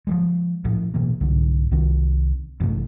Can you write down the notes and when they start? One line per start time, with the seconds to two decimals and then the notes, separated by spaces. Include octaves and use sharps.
0.07 F3 F#3 G#3
0.65 A2 F3
0.94 B2 E3 A#3
1.21 C2 G#2 D3
1.71 C2 D#3 C4
2.60 A1 G2 C3 A3